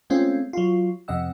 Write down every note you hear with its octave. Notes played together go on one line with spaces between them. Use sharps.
G#3 A3 C4 C#4 F4
F#3 F4
F2 C3 D#5 F#5 E6